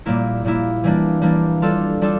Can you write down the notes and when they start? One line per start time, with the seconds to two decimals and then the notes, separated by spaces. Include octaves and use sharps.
0.06 A#2 G3 A#3 E4
0.45 A#2 G3 A#3 E4
0.84 E3 G3 A#3 D4
1.22 E3 G3 A#3 D4
1.62 G3 D4 F4 A4
2.02 G3 D4 F4 A4